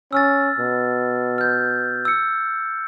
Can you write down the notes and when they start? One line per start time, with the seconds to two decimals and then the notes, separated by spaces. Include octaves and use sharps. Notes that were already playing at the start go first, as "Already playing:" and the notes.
0.13 C#4 E6 F6 A6
0.59 B2
1.38 F6 G6
2.05 E6 C#7